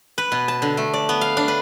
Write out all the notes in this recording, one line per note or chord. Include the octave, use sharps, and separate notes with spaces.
B4
B2
A5
D3
A3
D5
B3
F5
D4
B4